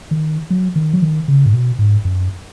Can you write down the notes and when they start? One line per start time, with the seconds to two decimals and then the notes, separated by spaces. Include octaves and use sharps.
0.11 D#3
0.50 F#3
0.76 D#3
0.93 F#3
1.02 D#3
1.28 C#3
1.46 G#2
1.54 B2
1.79 G#2
2.05 F#2